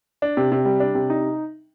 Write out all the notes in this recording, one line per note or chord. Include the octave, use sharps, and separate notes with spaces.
D4
C3
C3
G3
D4
C3
D#4